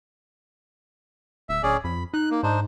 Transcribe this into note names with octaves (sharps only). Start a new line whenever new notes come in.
D1 E5
D1 C#4 G#4 D5
F2 B5
D#4 F#6
A#3
G#2 D4 D#4 C5